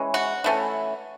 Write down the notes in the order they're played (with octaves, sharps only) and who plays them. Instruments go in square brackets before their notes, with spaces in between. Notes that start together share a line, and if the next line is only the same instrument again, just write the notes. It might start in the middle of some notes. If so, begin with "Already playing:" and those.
Already playing: [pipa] E3 G#3 C#4
F#4
E3 A3 C#4